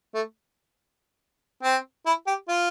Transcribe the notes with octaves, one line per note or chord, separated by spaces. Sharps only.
A3
C4
E4
G4
F4